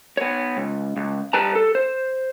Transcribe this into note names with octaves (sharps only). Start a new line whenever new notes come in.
B3 C#5
C#2
C#2
G3 B4 A5 A#5
A4
C5